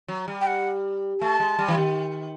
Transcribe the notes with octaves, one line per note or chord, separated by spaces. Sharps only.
F#3
G3
G5
F#5
A3 A5
G#3
G3
E3
D#3